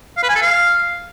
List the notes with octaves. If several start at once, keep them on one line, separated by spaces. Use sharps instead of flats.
F5
B4
G#5
A4
F5